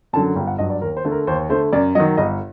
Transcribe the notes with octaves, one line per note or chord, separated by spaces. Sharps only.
F#2 D3 F#3 A5
G1 G5
F#5
G2 F#3 D#5
D5
D#2 A#4
C5
D3 A3
A#4
D#2 C5
D3 A3 C5
F#2 D5
D#3 F#3 D#5
G1 D#5